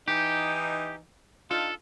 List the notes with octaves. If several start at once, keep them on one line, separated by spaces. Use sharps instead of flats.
E3 D#4 G4
D4 D#4 F4 A4